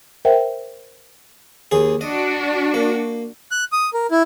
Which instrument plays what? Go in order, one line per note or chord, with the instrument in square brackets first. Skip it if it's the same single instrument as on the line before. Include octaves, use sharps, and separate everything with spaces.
[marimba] A#4 C5 E5 F#5 G5
[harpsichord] D#2 G#4
[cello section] D4 F#4 [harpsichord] D#5
[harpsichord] A#3
[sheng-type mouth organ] F#6
D#6
A#4
E4